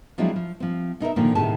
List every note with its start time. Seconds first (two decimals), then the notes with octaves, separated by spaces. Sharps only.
0.18 F3 F#3 G#3 C4 D4 E4
0.36 F3
0.60 F3 C4
1.00 B2 D#4 A#4 E5
1.16 A#2 D3 D#3 F3 A#3
1.35 D2 A2 C3 D#3 G#4 A5